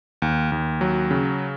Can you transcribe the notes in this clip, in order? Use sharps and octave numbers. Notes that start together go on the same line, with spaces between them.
D#2
D#2
F#3
C#3